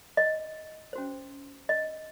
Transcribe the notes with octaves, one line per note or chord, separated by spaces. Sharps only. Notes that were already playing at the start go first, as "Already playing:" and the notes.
D#5
C#4 F#4 C5
D#5